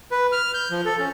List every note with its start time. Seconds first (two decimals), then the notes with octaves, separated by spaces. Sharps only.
0.12 B4
0.32 F6
0.54 G6
0.71 F3
0.85 A4
0.99 C#4